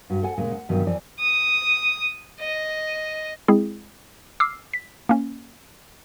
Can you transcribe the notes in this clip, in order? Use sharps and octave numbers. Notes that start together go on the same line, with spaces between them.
G2 F#4
A4 F#5 G#5
A#2 C#3 G#3
F#5
G2 B2 D#3 E3 F#3 G3
F2 E3 D5
D#6
D#5
G#3 C4 E4 G#4
D6 E6 F6 C7
B6
A#3 C#4